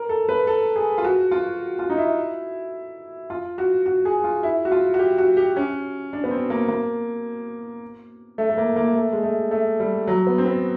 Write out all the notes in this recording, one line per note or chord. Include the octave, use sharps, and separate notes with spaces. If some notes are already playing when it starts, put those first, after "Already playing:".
Already playing: A#4
A4
B4
A4
G#4
F4
F#4
F4
F4
D#4
E4
F4
F#4
F#4
G#4
F4
E4
F#4
F4
F#4
G4
F#4
G4
C#4
D4
B3
C4
A#3
A#3
A3
A3
A#3
A#3
A3
G#3
A3
A3
G3
F#3
B3
C4
B3